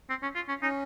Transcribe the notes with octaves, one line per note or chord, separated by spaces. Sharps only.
C4
C#4
F4
C#4
C#4 D#4